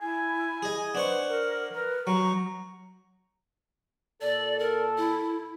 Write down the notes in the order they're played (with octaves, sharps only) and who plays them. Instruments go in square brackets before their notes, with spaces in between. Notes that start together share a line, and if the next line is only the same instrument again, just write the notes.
[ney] E4 [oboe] G#5
[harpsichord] G#4 D#5
[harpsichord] D4 C5 C#6 [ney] B4 [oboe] F#5
[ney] A#4
[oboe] A#4 [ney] B4
[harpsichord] F#3 [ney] A#5 [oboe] C#6
[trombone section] A#2 A4 [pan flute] D5
[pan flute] A#4
E4